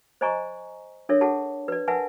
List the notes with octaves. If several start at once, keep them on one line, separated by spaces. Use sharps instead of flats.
C5 D5 D#5 G#5 A#5 C#6
D4 A4 A#4 C#5 E5
G#4 A4 F#5 A5
B4 D5
A#4 B4 E5 F#5 G#5 A5